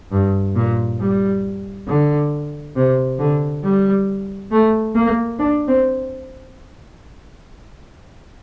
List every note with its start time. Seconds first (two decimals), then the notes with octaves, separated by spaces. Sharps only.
0.12 G2
0.56 A#2
1.01 G3
1.88 D3
2.76 C3
3.19 D3
3.64 G3
4.51 A3
4.95 A#3
5.39 D4
5.68 C4